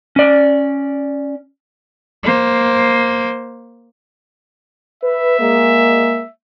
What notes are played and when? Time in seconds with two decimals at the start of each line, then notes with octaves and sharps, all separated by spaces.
0.16 C#4 D5
2.24 A#3 C5
5.03 B4 E5
5.40 G#3 A#3